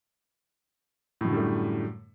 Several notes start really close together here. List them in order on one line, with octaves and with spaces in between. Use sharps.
A2 F#2 D3 G3 A3